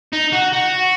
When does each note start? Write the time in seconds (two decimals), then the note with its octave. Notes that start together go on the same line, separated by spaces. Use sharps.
0.13 D#4
0.33 F#4
0.53 F#4